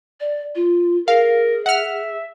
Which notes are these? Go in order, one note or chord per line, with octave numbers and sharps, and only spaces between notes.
D5
F4
G#4 A#4 F5
E5 F#5 F6